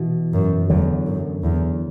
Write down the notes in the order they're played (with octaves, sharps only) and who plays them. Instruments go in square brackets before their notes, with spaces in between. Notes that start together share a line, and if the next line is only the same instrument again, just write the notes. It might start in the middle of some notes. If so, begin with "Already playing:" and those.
Already playing: [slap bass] B2 E3
[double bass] F#2
[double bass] E2 [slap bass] D3 F#3
[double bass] F#2
E2